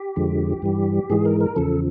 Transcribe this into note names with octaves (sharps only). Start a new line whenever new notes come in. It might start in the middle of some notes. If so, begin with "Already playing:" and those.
Already playing: G4
F2 D3 F3 G#3
G2 E3 G3
G#2 E3 G#3 G#4
A#4
A#4
E2 C#3 F3 A4